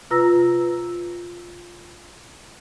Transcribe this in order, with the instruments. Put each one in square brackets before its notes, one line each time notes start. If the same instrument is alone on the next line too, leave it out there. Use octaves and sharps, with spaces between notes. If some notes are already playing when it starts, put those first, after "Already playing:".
[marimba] C3 F4 B4 A#5 E6 A#6